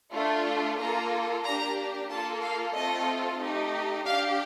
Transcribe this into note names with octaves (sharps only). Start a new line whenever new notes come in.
A3 D4 F4 A4
A#3 F4 A4 A#5
A#3 D4 G4 A#5
A#3 F4 A4 A5
F5
A3 C4 F4 A4 D#5
A3 D#4 G4
D4 G4 F5